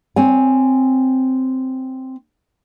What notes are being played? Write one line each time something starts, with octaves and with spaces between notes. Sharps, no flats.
C4 C#5 G#5